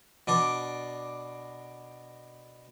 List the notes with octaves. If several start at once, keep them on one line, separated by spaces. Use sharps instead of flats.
B2 D4 D5 D6